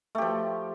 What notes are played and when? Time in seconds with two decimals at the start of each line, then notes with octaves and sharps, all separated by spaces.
0.15 A3
0.18 G4
0.22 F3